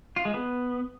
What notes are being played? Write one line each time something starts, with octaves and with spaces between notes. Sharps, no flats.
F4
G#3
B3